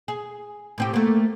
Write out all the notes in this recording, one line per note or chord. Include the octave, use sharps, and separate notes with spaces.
G#4
A2 C4 G4
A3 A#3